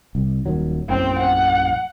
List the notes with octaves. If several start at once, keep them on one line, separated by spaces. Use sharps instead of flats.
C2
D#1 D#3 F#3
A#1 F#2 A2 C4 G5
F#5